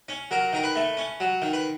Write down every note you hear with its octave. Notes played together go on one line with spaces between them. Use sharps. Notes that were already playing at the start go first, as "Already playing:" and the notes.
C#4
F#3 A#4
D#3 A#4
B4
A3
C#4
F#3
D#3
B4